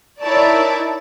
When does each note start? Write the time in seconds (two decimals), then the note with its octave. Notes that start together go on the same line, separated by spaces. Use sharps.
0.22 D#4 E4 A#4 C#5 D5 A5